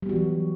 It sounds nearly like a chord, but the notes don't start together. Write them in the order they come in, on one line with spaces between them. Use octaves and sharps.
G3 B3 F#4 E3 F#3